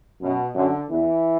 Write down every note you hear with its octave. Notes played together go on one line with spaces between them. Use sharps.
F#2 B2
F#2 D3
E2 E3